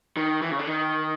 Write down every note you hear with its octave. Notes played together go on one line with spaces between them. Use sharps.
D#3
E3
C#3
D3
D#3